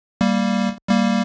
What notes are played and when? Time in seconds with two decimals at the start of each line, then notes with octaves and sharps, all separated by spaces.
0.21 G3 A#3
0.89 G3 A#3